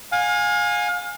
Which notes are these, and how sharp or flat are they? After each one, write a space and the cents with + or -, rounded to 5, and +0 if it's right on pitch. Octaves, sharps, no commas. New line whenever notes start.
F5 +35 G#5 -10